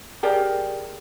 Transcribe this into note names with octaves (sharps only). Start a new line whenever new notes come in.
G4 G#4 A#4 D5